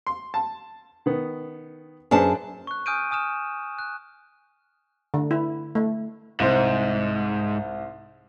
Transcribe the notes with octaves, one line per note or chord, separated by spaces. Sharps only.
C6
A5
D#3 B3
F#2 D4 G#4 B4 C5 A5
C#6 F#6
G#5 D#6 F6 G6 D7 D#7
G#5 D#6 F6 E7
F#6
D3
E4
A3
C2 G#2 C5